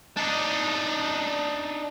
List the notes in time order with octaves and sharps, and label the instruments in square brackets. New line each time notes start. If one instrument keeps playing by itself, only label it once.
[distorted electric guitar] D4 D#4